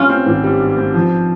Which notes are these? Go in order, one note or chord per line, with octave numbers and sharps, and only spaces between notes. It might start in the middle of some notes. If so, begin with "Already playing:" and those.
Already playing: G2 C#4 F4
C4
G#1
G3
G2
C4
F3